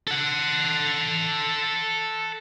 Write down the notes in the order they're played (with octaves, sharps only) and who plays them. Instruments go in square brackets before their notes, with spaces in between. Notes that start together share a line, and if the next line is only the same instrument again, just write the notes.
[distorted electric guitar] A4 F#5